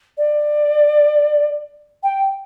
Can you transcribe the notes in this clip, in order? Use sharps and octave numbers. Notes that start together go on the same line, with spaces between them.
D5
G5